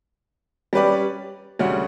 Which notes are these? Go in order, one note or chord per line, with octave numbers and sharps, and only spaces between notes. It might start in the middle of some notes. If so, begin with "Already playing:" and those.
G3 C#4 G4 B4 D5
D2 C#3 G3 C#4 F#4